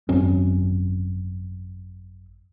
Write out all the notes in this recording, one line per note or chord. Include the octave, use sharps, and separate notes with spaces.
G#1 F#2 C4 C#4